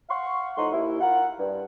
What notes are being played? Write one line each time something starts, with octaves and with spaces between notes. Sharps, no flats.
F5 F#5 C6 C#6
A2 F3 D#4 F#5 C6
D#2 E4
F4 A#4 F#5
G2